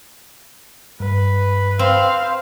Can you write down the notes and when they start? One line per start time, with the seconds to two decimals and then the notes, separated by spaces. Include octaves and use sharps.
1.00 G2 B4
1.79 C4 F5